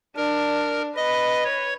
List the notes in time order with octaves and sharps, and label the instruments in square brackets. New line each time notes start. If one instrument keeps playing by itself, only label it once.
[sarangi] D4 [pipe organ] A#4
[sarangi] B4 [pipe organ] D#5
[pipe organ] C#5